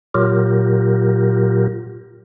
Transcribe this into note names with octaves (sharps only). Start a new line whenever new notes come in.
A#2 F#3 F4 G4 A#4